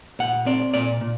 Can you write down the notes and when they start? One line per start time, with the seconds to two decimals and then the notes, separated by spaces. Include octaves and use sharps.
0.19 A#2 F#5
0.46 C4 D5
0.74 A#2 D5
1.01 A#2